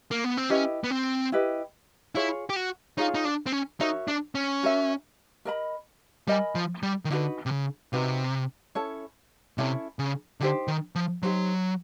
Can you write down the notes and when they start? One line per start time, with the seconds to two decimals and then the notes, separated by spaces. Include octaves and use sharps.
0.11 A#3
0.24 B3
0.37 C4
0.50 C#4 E4 G4 B4 D#5
0.84 B3
0.91 C4
1.32 E4 G4 B4 D#5
2.15 E4 F4 G#4 C#5
2.50 G4
2.56 F#4
2.98 D#4 F4 G#4 C#5
3.15 D#4
3.25 D4
3.46 C4
3.52 C#4
3.80 D#4 F#4 A#4 C#5 E5
4.08 D4
4.35 C#4
4.63 F#4 A#4 C#5 E5
5.45 A#4 D#5 G#5 B5
6.28 G3 A#4 D#5 G#5 B5
6.55 F3
6.83 G3
7.05 D#3
7.10 D3 D#4 F#4 B4
7.46 C3
7.52 C#3
7.93 C3 D#4 F#4 B4
8.75 C#4 E4 A4 C#5
9.58 C3 C#4 E4 A4 C#5
9.99 C#3
10.40 D3 D#4 G4 C5
10.68 D#3
10.95 F3
11.23 F#3 D#4 G4 C5